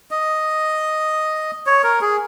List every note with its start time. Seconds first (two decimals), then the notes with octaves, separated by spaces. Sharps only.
0.11 D#5
1.66 C#5
1.84 A#4
2.01 G#4